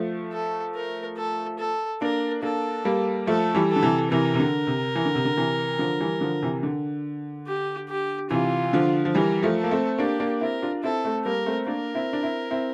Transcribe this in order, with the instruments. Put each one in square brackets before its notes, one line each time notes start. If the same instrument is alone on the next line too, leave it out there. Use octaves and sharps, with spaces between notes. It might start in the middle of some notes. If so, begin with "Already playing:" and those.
Already playing: [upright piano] F3 A3
[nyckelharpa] A4
A#4
A4
A4
[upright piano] A#3 D4 [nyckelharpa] A#4
[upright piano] A#3 D4 [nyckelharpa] A4
[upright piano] G3 A#3
[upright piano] F3 A3 [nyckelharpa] A4
[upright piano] E3 G3
[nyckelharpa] A4
[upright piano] D3
C3 E3
[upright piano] C3 E3 [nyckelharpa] A#4
[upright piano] C3
D3
C3
E3
D3
C3
D3
C3 E3
D3 F3
E3 G3
D3 F3
C3 E3
D3
[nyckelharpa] G4
G4
[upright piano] C3 E3 [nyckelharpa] F4
[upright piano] D3 F3
F3
[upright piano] E3 G3 [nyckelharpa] A#4
[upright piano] F3 A3
[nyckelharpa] A4
[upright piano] A#3
A3 C4
[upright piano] A#3 D4 [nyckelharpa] G4
[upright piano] A#3 D4
[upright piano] C4 E4 [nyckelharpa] A#4
[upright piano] D4 F4
[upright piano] C4 E4 [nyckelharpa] A4
[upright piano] A3 C4
[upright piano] G3 A#3 [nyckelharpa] A#4
[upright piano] A3 C4
[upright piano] A#3 D4 [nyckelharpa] A#4
[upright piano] C4 E4
D4
C4 E4
C4 E4